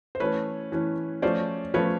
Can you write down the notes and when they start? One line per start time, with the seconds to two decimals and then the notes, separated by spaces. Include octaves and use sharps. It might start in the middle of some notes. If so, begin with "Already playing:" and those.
0.15 C5
0.20 E3 A3 C#4 B4 C#5
0.72 E3 A3 C#4
1.22 F3 A3 C#4 C5 D5
1.74 F3 A3 C#4 B4 C#5